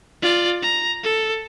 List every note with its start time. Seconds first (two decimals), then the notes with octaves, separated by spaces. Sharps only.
0.22 F4 D5
0.63 A#5
1.03 A4